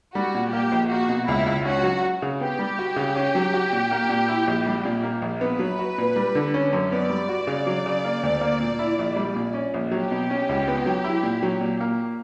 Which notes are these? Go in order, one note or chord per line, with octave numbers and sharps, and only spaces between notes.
G3 F#4
A#2
A#3 G4
A#1
A#3 F#4
B2
C#2 E4
C#2
C#4 F#4
F#3
F#4
C#3
B3 G4
G3
F#4
C#3
C#4
F#3
F#4
A#2
A#3
A#2
E4
A#1
G3
A#2
A#3
A#1
B3 B4
F#3
F#4
A#2
G3
D3
C#4
F#2
B3 D5
G3
F#4
C#3
F#3
C#3
A#3
D2
A#3
A#2
E4
A#1
G3
A#2
C#4
A#1
F#3 G4
B2
C#4
C#2
B3
F#3
E4
A#2
F#3
A#2
A#3